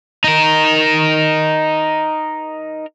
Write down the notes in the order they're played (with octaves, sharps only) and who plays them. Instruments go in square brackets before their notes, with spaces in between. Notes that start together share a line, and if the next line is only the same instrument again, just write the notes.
[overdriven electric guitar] D#4 A#4